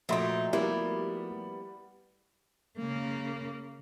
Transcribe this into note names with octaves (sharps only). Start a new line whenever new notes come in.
A#2 F3 A3 D#4 F#4 E5 C6 D7
G3 A#3 B3 E4
C#3 A#3